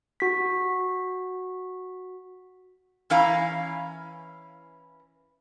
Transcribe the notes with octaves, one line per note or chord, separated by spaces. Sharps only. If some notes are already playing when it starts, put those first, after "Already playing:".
F#4 B6
E3 C#4 E4 F5 A#5